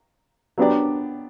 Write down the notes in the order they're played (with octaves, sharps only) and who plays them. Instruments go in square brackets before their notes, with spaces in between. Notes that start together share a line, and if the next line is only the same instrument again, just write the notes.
[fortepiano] F#3 B3 D4 G4 D5